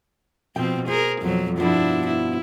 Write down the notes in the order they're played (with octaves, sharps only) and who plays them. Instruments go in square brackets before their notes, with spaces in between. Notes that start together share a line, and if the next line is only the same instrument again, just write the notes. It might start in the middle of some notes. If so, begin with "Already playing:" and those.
[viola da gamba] B2 F3 C4 [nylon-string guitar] G5
[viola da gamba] G#4 A#4 [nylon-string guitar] C5
[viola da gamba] F2 B2 F#3
[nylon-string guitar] G2 B2 F3 [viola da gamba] D4 E4
[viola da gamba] E4